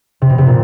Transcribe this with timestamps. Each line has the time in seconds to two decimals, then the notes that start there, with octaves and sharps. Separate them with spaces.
0.22 C3
0.30 B2
0.38 C3
0.47 A#2